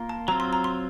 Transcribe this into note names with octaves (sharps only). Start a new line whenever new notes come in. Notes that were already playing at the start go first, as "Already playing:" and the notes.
Already playing: A#3 F4 A#4
A5
F#3 C4 F4 A#5
C6
A#5
C6